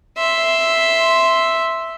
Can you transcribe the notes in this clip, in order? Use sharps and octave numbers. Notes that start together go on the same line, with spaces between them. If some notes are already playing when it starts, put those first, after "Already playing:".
E5 C6